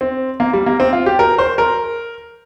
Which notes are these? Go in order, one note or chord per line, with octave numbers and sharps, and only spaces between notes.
C4
A#3
G3
A#3
C4
F4
G4
A#4
C5
A#4